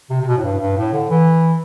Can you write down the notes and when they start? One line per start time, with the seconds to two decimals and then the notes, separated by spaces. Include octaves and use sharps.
0.10 C3
0.21 C3
0.27 B2
0.37 A2
0.43 G2
0.59 G2
0.77 A2
0.93 D3
1.09 E3